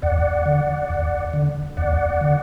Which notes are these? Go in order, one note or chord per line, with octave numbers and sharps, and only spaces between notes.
E2 D5 F#5
D3
E2
D3
E2 D5 F#5
D3